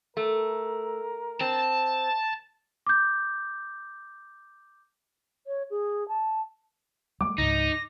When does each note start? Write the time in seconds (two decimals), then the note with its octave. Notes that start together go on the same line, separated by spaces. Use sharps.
0.17 A3 A#4
1.41 C4 A5
2.87 D6 G6
5.47 C#5
5.70 G#4
6.08 A5
7.21 G3 A3 D6
7.38 C#2 G#2 D#4 A#6